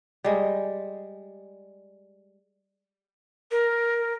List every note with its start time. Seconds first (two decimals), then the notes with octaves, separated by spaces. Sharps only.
0.24 G3 G#3
3.51 A#4